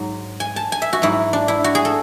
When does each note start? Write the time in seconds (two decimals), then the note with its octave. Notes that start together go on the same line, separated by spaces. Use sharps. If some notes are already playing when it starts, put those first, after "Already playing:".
Already playing: G#2 F#3
0.40 G#5
0.56 A5
0.72 G#5
0.82 E5
0.93 F#4
1.02 G#2 F#3 E4
1.33 D4
1.48 E4
1.64 F#4
1.75 G#4
1.85 A4